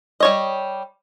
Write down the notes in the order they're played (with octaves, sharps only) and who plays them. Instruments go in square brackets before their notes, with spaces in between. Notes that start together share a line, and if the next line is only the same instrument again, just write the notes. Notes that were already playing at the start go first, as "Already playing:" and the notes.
[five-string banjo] G3 C#5 D#5